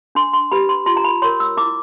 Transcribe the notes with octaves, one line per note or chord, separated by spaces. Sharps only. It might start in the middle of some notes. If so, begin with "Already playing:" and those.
D4 C6
C6
G4 B4 B5
C6
F4 C6
A#5
B5
A#4 C#5 C6
E6
E4 D6